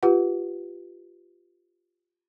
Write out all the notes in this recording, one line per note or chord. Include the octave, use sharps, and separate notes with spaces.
F4 G4 B4 F#5